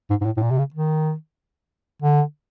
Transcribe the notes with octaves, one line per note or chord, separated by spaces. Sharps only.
G#2
G#2
A2
A2
A#2
C3
C#3
D#3
D3